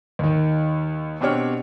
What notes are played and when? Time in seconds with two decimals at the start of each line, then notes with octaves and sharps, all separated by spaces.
0.19 D#2 D#3
1.21 B2 C4 D4 G4 C#5 F6